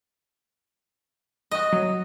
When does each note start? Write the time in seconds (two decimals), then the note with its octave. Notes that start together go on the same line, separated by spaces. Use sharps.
1.51 F#4 D#5
1.73 F#3